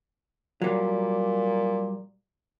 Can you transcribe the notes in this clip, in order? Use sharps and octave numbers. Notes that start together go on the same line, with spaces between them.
A#2 F#3 G3